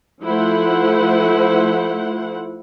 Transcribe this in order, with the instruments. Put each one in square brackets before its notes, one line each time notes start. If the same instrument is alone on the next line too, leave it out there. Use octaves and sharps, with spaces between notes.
[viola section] F3 A3 E4 C5 F#5